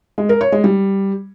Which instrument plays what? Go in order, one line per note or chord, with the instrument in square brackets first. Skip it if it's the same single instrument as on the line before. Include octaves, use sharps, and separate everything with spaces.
[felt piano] G#3
A#4
C#5
G#3
G3